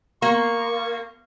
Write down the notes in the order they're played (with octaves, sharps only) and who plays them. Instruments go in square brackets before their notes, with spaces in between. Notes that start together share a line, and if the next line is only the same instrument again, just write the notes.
[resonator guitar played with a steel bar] A#3 [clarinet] C#6